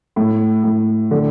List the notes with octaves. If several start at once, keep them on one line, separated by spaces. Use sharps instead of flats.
A2
A2
D3